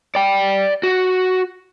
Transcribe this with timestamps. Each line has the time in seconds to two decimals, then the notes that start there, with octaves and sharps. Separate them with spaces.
0.15 D5 G5
0.83 F#4